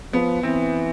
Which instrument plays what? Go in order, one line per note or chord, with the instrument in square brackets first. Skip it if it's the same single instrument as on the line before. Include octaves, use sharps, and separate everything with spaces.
[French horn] F3 [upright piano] B3
[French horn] E3 [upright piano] C4